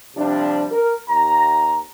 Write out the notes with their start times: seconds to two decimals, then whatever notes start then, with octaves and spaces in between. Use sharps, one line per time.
0.16 C3 F3 G3 D4
0.71 A#4
1.09 D#2 A#5